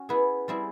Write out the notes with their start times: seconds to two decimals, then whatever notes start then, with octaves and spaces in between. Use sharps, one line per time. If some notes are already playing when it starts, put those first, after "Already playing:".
Already playing: C#4 F#4
0.09 B3 E4 G#4 B4
0.48 G3 C4 E4 G#4